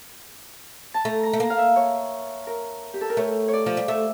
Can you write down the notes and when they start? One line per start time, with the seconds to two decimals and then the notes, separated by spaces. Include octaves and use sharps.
0.94 A5
1.05 A3 A#5
1.23 A#5
1.33 A3
1.40 A#3 A#5
1.50 F5
1.58 E5
1.76 C#5
2.47 A#4
2.94 G4
3.01 A4
3.09 A#4
3.17 A3 C#5
3.48 C#5
3.53 D5
3.66 F3
3.77 G3
3.88 A3 E5